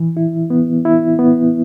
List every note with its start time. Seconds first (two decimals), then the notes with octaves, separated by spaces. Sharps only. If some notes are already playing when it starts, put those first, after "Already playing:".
Already playing: E3
0.17 E4
0.50 B3
0.85 E4
1.19 B3